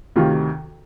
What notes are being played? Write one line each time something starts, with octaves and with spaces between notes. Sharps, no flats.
D2 C3 D#3 F4